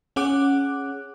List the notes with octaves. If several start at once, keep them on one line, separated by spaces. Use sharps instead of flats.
C#4 G#4 F#5 D6 F#6